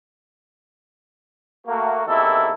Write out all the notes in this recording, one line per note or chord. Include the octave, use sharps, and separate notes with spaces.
A3 A#3 F#4
E2 C3 D#3 A#3 E4 A4